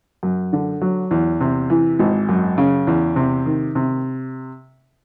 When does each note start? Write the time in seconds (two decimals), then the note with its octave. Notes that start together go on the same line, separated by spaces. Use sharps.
0.23 F#2
0.53 D3
0.81 F#3
1.11 E2
1.41 C3
1.70 E3
1.99 G#1
2.29 F#2
2.58 C#3
2.87 E2
3.16 C3
3.46 D#3
3.75 C3